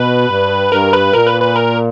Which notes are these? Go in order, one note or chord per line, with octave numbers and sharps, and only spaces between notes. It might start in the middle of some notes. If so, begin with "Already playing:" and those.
Already playing: B2 B4
G2
G2 A#4
B4
A#2 A#4
B4
B4
A#4